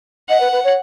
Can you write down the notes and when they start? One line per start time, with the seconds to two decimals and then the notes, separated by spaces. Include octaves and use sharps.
0.29 D#5 F#5
0.40 B4
0.52 B4
0.64 C#5